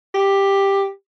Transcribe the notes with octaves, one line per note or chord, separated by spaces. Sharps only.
G4